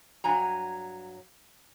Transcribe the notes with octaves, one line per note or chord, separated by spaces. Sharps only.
G2 F#3 G#5 A#5